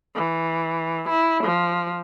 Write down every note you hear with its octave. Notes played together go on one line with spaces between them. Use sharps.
E3
E4
F3